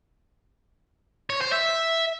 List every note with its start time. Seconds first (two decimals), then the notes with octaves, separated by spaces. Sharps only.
1.30 C#5
1.41 C5
1.52 E5